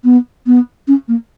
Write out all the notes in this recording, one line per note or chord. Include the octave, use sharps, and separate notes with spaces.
B3
B3
C#4
A#3